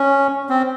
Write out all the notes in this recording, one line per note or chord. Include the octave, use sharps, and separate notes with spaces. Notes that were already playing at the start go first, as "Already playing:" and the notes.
Already playing: C#4
C4